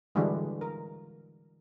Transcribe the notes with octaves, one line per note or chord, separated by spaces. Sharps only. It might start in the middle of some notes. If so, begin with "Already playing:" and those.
D3 E3 G3 G#3 D4 F#4
A#4